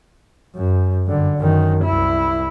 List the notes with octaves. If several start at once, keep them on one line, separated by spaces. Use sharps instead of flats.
F#2
G2 D3
F#2 D#3
C2 E4